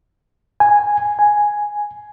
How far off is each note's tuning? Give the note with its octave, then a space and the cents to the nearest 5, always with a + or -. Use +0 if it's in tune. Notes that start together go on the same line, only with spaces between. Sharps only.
G#5 -5
G#5 +0